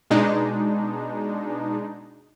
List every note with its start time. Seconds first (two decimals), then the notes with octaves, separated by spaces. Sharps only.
0.11 B2 G#3 D4 D#4